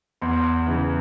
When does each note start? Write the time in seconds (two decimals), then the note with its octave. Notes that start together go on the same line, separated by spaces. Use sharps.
0.22 E2 C6
0.67 C#3 E3